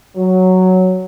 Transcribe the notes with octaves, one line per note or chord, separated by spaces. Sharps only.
F#3